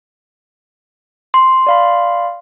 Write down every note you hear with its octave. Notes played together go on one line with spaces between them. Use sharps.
C6
D5 F5 B5